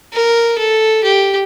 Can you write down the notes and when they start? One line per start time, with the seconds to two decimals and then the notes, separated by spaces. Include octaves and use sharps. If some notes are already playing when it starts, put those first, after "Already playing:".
0.13 A#4
0.58 A4
1.03 G4